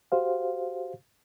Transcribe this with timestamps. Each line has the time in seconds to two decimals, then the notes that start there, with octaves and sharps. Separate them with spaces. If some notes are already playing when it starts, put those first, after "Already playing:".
0.12 F#4 G4 C5 F5